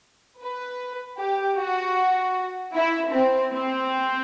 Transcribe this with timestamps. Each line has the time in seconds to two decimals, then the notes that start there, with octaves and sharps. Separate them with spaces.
0.40 B4
1.18 G4
1.57 F#4
2.74 E4
3.13 C4
3.52 C4